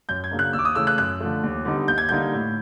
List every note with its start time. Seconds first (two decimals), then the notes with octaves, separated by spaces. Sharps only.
0.09 F#2 G6
0.24 G#6
0.31 C#3 F#3 A#3 D4
0.39 F#6
0.53 D#2 E6
0.59 D6
0.65 D#6
0.75 C#3 E3 A3 E6
0.87 F#6
0.98 F#2 F#6
1.20 D3 F3 A3
1.43 D#2
1.65 D3 G3 B3 D#4
1.88 D#2 G6
1.98 G#6
2.09 D3 G3 A#3 D#4 G6
2.33 A2